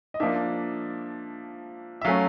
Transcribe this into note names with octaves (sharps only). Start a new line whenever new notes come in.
D#5
F3 A#3 D4 E5
E5
F#3 A3 C#4 F5